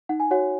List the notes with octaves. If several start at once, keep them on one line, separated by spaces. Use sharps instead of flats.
D#4 F#5
G#5
F#4 C#5 F#5